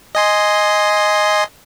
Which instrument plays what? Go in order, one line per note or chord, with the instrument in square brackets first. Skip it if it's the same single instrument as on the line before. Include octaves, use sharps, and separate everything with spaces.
[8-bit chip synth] D#5 G#5 C6